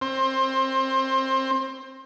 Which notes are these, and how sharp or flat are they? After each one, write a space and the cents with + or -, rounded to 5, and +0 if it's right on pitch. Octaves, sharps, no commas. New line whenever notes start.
C4 +25